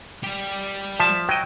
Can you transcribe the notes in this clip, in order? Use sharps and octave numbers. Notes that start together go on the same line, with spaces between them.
G3 G4
F3 E5 A5
F#3 D#5 G5